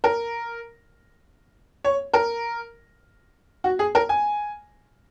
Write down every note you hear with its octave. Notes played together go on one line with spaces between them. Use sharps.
A#4
C#5
A#4
F#4
G#4
A#4
G#5